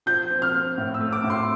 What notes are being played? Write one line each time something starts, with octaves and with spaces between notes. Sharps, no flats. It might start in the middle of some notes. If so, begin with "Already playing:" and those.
F3 G6
C4
F6
C4
A2
E6
A3
D6
A2
C6